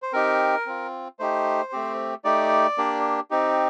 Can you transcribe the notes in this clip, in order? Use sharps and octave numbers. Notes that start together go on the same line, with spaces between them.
C5
C4 D#4 G4 A#4
C4 F4
A3 D#4 G4 C5
A3 C4 G4
A3 D#4 G4 D5
A#3 D4 G4
C4 D#4 G4